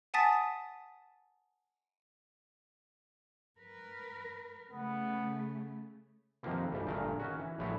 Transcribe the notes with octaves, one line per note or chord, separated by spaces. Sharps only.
F#5 G#5 A5 D#6 A6 B6
A#4 B4
C#3 A3 B3
F2 C3 D#3 F3 A#3 B3
D2 G#2 G3
G1 G2 A#2 A3 G#4 A#4
D#3 C#4 F#4
E3
A#1 A2 G3 B3 E4 C#5